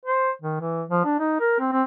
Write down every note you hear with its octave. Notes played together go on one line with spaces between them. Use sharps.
C5
D#3
E3
F3
D4
D#4
A#4
C4
C4